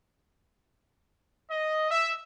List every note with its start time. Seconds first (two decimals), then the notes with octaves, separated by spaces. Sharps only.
1.50 D#5
1.91 E5